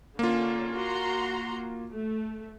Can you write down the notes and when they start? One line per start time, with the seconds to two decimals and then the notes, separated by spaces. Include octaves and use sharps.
0.19 D3 A#3 C#4 F4
0.73 F#4 A#5 C6
1.90 A3